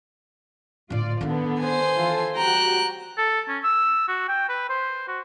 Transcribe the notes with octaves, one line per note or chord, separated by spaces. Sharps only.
A2 D3 F4 D5
D3 D#3 B3 E4
C5 G#5
E3 F4 A4
G3 F#4 G5 A#5 F#6
A4
C#4
E6
F#4
G5
B4
C5
F#4